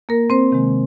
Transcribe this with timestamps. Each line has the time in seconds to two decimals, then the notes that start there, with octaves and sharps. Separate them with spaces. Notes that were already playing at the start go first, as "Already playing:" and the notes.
0.09 A#3 A#4
0.30 C4 C5
0.52 C3 D#3 G#3